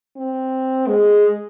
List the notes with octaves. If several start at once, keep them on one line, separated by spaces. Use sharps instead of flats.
C4
G#3